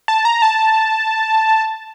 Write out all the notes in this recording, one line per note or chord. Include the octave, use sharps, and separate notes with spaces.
A5
A#5
A5